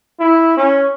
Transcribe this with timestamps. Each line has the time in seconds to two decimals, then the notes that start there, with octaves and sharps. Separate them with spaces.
0.20 E4
0.57 C#4